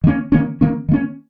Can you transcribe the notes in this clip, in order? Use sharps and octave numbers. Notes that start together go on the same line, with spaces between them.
D#3 A#3 C#4
D#3 A#3 C#4
D#3 A#3 C#4
D#3 A#3 C#4